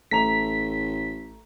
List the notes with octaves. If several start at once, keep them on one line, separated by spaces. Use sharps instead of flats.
A1 A3 A#5 B6 F7